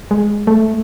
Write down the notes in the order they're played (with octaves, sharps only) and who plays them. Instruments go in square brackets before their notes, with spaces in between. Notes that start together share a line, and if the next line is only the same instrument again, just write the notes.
[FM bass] G#3
A3